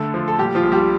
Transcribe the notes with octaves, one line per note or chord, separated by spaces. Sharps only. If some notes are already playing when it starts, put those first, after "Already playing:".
Already playing: D3 A3 A4
F3
A4
A#2 G3 G4
F3 F4
A#1
G3 G4